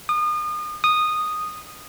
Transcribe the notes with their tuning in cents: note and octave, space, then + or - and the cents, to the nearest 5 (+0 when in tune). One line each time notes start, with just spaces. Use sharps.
D#6 -35
D#6 -10